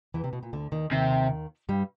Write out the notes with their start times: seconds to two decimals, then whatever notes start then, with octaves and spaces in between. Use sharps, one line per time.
0.14 E2 E3
0.24 C3
0.33 B2
0.43 A#2
0.53 D2 D3
0.72 D#2 D#3
0.91 D#2 C3 D#3
1.69 G2 G3